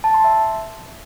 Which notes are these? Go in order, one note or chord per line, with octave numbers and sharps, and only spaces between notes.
A5
C6
E5